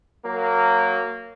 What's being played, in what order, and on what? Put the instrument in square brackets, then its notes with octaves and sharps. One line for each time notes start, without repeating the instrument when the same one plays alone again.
[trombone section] F#3 A#3